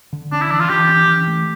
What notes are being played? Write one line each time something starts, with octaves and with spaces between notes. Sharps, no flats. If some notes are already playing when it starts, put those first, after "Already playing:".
D3
C#4 D4
E4
E3 D4
F4
E3 G4
C#4
E3
A3